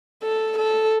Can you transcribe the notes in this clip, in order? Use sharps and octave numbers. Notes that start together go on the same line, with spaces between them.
A4
A4